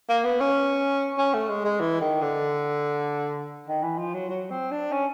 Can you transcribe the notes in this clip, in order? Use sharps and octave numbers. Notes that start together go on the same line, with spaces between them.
A#3
B3
C#4
C#4
A3
G#3
G#3
E3
D#3
D3
D#3
E3
F3
F#3
F#3
C4
D4
C#4